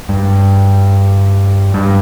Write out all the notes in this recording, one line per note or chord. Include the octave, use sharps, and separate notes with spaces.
G2
G2